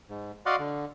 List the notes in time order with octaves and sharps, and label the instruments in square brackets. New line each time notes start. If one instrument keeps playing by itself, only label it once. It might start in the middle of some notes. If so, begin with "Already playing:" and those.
[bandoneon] G#2
F#4 D5 D#5 F5 F#5 C6
D3